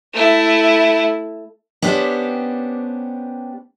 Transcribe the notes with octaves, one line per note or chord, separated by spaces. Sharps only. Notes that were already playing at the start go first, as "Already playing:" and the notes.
A3 E4
B3 C#4 D4 G4 C5